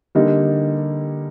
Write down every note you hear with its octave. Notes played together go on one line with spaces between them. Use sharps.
D3 G3 A#3 D#4